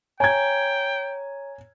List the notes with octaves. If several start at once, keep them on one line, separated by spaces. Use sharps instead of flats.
C#5 G5 G#5 A#5 G#6